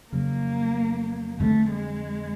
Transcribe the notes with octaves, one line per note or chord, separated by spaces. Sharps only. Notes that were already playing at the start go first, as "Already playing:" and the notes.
F2 C#3 F#3 A#3
F2 D3 G3 A3 C4
G#3